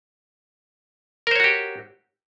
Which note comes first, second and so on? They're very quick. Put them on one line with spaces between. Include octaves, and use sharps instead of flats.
A#4 C5 C#5 F#4 G4